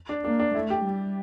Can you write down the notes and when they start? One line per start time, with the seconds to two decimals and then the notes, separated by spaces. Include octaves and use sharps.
0.09 D4
0.25 A#3 D4
0.40 D4
0.55 A3 E4
0.70 G4
0.85 G3